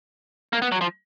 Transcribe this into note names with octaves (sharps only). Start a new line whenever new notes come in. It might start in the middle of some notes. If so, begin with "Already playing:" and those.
A#3
B3
F#3
F3